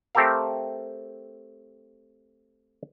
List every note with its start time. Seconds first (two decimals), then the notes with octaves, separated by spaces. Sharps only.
0.15 A3 C4 G4 A4 A#4 F5